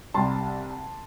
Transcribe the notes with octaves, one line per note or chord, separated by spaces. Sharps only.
C2 C3 G3 A5 C6